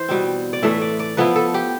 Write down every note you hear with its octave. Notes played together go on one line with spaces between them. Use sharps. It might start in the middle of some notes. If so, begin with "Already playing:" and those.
Already playing: E3 E4 C5
B2 G3 C4
D5
A2 E3 A3 E5
D5
D5
F3 B3 E4 B4
A4
G4